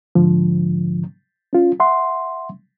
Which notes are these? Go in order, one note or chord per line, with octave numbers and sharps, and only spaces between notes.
G#2 D3 F3
C#4 F4
E5 F#5 C6